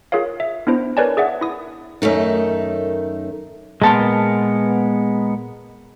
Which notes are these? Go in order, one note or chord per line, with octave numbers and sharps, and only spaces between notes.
F4 G#4 A#4 C#5 F5
E5
B3 D4 E4 C5
A#4 B4 C#5 D5 G#5 A5
G#4 D5 E5 F#5
E4 D#6
F#2 D#3 A3 D#4
A#2 G#3 B3 A#4 A5 C6